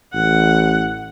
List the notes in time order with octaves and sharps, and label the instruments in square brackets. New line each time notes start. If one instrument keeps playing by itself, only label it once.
[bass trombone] A1 [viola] F#5